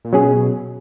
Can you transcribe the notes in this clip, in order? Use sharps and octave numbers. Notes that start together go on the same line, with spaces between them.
A#2
B2 F#3 C#4 G#4